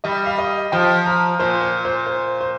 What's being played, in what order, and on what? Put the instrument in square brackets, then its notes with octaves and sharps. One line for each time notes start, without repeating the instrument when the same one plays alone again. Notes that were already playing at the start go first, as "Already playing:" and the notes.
[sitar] G3 [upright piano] D#5
[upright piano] F5
D#5
[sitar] F3 [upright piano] G5
[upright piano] A#5
[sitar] A#2 [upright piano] C5
[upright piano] C5
C5
C5
C5